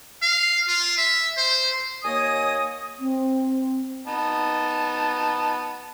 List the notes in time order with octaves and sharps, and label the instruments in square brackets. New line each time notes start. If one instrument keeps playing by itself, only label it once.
[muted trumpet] F5
F4
E5
C5
[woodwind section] D#2 A#3 C#5 D#5 G#5 D#6
[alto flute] C4
[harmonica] B3 D#4 A5